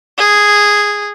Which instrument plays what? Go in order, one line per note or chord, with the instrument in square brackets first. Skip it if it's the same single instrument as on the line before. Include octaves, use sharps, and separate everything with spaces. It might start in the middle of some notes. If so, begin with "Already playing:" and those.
[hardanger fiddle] G#4